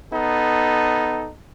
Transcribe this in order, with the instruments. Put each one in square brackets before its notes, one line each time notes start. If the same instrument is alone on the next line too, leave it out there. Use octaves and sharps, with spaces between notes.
[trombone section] B3 D#4 A4